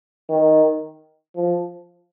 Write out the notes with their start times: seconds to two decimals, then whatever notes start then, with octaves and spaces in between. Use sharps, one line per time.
0.29 D#3
1.36 F3